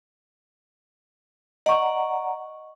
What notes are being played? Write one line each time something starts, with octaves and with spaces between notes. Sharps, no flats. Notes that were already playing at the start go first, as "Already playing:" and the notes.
D5 D#5 F#5 A#5 C#6